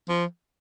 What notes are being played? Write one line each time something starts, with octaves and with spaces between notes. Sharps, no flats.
F3